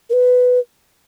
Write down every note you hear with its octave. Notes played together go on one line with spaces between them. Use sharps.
A#4
B4